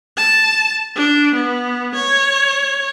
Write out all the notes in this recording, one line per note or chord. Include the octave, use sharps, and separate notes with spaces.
A5
D4
B3
C#5